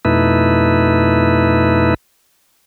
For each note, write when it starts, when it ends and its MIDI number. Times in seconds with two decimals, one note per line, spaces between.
0.05 1.94 41
0.05 1.94 47
0.05 1.94 57
0.05 1.94 63
0.05 1.94 64
0.05 1.94 71